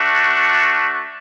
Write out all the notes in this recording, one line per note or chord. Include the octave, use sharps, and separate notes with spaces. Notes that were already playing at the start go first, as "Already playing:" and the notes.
Already playing: A3 D4 F#4